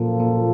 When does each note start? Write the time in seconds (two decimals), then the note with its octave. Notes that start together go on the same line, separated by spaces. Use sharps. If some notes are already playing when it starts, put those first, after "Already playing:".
Already playing: F#2 A#2 F3 A#3 F4 A4
0.20 A#2